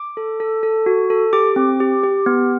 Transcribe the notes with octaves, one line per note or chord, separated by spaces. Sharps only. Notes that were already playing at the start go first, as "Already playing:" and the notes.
Already playing: D6
A4
A4
A4
F#4
A4
G4 D6
C4
G4
G4
B3